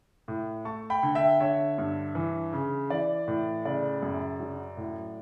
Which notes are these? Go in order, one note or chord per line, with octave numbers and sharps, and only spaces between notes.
A2
A3 A5 C#6
G5 B5
D3
E5 G5
D3 C#5 E5
G2
E3
C#3
E3 D5
A2
C#3 D5
F#2
F#3
A2